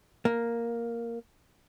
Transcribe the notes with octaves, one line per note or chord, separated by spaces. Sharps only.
A#3